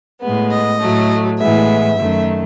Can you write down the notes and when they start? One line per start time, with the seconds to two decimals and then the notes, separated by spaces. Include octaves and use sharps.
0.21 A2 G#3 B3
0.50 D#5
0.79 A2 F#3 A3
1.39 A2 E3 G#3 B3 E5
1.96 F#2 D#3 A3